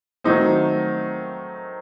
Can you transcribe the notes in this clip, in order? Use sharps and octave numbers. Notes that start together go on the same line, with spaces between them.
D#3 F#3 A3 C4 D#4